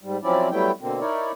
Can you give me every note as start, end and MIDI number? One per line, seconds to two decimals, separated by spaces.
0.03 0.17 44
0.03 0.17 55
0.23 0.49 53
0.23 0.49 54
0.23 0.49 60
0.23 0.49 61
0.23 0.49 64
0.23 0.49 74
0.51 0.71 54
0.51 0.71 55
0.51 0.71 57
0.51 0.71 59
0.51 0.71 64
0.51 0.71 79
0.81 1.00 47
0.81 1.00 50
0.81 1.00 58
0.81 1.00 60
1.00 1.32 63
1.00 1.32 64
1.00 1.32 70
1.00 1.32 73
1.00 1.32 74